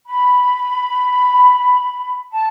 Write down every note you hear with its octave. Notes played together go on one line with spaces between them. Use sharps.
B5
A5